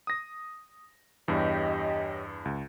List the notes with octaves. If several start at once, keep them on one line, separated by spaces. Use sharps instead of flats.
D#6 A#6
E2 G2 G4 C#5 D#5
C#2